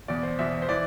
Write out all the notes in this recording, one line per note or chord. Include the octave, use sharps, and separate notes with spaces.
E2 B2 D5
C5
E2 B2 E5
C5
E3 D5